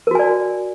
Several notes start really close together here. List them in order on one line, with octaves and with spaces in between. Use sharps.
A#4 F#4 G#5 D5